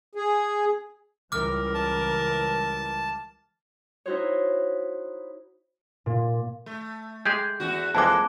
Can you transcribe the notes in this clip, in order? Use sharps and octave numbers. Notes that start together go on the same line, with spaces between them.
G#4
C#2 E3 G3 A#4 D6 F6
A5
D#4 E4 F#4 C5 C#5
A#2
A3
G#3 G4 G#4 G6
E2 F#4
F2 E3 G#3 A#3 A5 D6